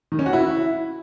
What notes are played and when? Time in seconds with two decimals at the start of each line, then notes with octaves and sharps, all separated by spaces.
0.12 D#3
0.19 C#4
0.26 F#4
0.33 E4